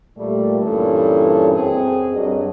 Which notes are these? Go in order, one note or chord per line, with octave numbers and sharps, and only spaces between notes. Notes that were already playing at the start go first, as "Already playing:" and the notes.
A#2 G3 A3
G2 A#2 E3 C#4 A4 C#5
F#2 C4 G#4
G2 F#3 D#5